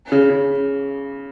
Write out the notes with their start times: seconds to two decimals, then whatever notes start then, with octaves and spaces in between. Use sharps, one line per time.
0.12 C#3
0.30 C#3